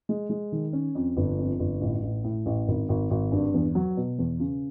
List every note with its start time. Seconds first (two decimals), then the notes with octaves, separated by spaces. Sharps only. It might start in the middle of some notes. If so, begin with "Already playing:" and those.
0.09 G#3
0.30 G#3
0.52 D#3
0.73 C#4
0.95 F2
1.17 G1
1.38 F2
1.60 G1
1.81 A1
2.03 A1
2.24 A2
2.46 A1
2.68 G#1
2.89 G#1
3.10 G#1
3.32 G2
3.54 E2
3.75 F#3
3.97 B2
4.19 E2
4.40 C#3